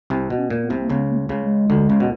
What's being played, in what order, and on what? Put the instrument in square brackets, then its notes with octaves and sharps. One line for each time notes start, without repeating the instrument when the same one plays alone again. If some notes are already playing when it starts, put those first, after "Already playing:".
[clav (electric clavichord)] C2 C3 [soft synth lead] C4
[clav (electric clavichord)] B2
[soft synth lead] C#4
[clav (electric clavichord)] A#2
[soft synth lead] B3
[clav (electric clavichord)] C2 C3
[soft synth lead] A#3
[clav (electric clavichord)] C#2 C#3 [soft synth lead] B3
[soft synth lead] A#3
A3
[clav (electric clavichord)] C#2 C#3
[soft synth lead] G#3
[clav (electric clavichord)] D2 D3
C#2 C#3
B2